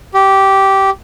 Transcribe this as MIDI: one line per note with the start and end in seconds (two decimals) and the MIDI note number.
0.14 0.90 67